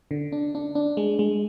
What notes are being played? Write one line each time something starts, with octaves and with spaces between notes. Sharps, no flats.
D3
D4
D4
D4
G#3
G#3